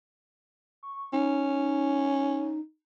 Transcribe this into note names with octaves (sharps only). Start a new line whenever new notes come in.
C#6
C#4 D#4